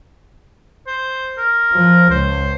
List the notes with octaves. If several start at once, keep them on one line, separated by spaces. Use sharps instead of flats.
C5
A#4
F3
C#2 C5